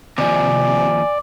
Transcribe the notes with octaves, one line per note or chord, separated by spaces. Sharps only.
D#2 C3 F3 D5 G#5